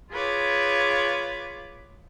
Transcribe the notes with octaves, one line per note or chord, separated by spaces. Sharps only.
F4 G#4 B4 C#5 D6